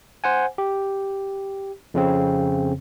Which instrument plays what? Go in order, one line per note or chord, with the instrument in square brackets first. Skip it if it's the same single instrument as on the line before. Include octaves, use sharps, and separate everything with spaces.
[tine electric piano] C5 F#5 G#5
G4
F2 C#3 C4